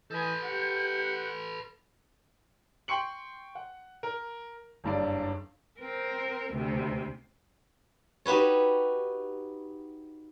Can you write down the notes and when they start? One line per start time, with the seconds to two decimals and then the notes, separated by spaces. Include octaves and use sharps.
0.11 E3 A4 B4 D#5 G#5 G6
0.43 G4 F#5
2.88 G5 C6 C#6 C#7 F#7
3.55 F#5
4.03 A#4
4.84 F#1 G2 D5
5.80 C4 A#4
6.54 D2 C3
8.26 D#4 F#4 G4 B4 C#5